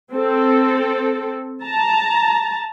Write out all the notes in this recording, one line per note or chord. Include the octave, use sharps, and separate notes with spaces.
C4 A4
A5 A#5